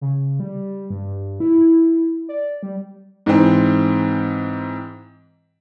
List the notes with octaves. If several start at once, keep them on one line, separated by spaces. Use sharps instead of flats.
C#3
G3
G2
E4
D5
G3
G#2 E3 C4